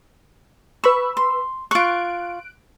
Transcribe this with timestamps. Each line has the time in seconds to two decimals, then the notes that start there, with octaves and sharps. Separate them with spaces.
0.84 B4 B5 C#6 E6
1.17 C6
1.71 F4 C#6 F#6 D7